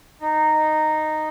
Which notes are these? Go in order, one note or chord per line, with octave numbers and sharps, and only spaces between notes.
D#4